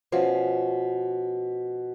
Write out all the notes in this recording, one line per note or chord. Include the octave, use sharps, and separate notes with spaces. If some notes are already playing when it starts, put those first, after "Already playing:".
B2 F3 C#4